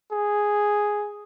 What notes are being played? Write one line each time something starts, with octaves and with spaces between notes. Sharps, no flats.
G#4